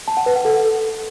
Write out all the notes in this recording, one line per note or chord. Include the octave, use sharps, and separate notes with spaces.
A5
F#5
B4
F#5
A4